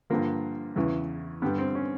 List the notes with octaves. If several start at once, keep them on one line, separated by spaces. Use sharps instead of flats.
G2 D3 F3 A#3
E2 C#3 E3
G2 D3 G3 B3
C4
C#4